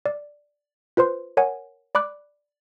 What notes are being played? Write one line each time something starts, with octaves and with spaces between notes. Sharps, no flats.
D5
F4 B4 C5 C6
A#4 C#5 F#5 G#5
D5 B5 D6 F#6